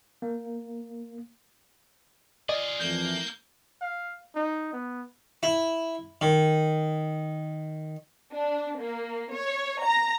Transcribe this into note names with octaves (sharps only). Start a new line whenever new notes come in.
A#3
F4 G#4 D5 D#5
F2 E3 A3 A#3 G6
F5
D#4
B3
E4
D#3
D4
A#3
C#5
A#5